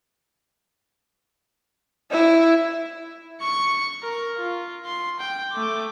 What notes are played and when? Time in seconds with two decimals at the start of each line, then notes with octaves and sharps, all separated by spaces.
2.11 E4
3.42 C#6 C#7
4.03 A#4
4.37 F4
4.86 C6
5.20 G5
5.53 A3 D6